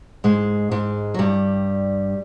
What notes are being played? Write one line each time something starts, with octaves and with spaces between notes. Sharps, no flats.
G#2 G#3
G#2 G#3
F#3
G2 G3